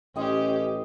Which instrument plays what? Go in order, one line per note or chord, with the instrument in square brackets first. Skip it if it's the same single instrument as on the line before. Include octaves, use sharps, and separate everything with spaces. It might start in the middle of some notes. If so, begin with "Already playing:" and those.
[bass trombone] A1 [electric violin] C#4 G4 [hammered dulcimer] C5 D#5 G5